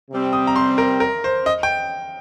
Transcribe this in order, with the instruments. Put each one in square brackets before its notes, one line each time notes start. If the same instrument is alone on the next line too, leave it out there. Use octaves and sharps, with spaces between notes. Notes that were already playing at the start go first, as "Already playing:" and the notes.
[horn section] C3 G3 C4 G4
[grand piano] D#6
A#5
C6
A#4
A#4
C5
D#5
G5